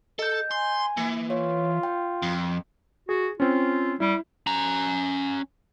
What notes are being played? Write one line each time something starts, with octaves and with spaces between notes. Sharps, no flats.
A4 D#5 G6
G#5 C6
E3 A#3
F4 C#5
G5
F2
F#4 G#4
C4 C#4 F4
G3 E4
C#4 A#5